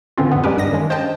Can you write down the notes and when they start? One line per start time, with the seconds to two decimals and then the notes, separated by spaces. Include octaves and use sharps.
0.18 A2 D3 E3 C4 C#4 F4
0.31 F2 B3
0.44 G3 G#3 C#4 G4 A#4 B4
0.57 G2 D#6 A#6
0.72 D#3 G#3 C#4
0.90 C5 D#5 F5 G5 A5